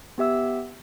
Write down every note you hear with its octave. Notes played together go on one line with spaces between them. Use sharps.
B3 G4 E5 E6